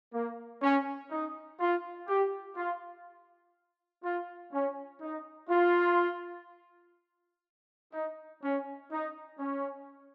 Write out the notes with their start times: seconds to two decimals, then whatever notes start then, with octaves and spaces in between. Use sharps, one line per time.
0.13 A#3
0.62 C#4
1.11 D#4
1.60 F4
2.08 G4
2.57 F4
4.04 F4
4.53 C#4
5.02 D#4
5.49 F4
7.93 D#4
8.43 C#4
8.92 D#4
9.40 C#4